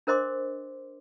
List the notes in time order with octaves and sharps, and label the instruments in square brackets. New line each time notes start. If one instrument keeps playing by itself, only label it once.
[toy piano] D4 A#4 C5 D#5 C6 D6